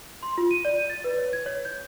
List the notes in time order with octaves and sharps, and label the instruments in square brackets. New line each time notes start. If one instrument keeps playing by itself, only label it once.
[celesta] C6
F4
D#7
D5
D#7
A6
B4
C#5
G#6
C#5
G6